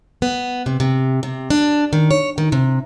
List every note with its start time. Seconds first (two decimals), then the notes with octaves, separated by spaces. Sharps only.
0.22 B3
0.66 C3
0.80 C3
1.23 C3
1.50 D4
1.93 D#3
2.11 C#5
2.38 D#3
2.52 C3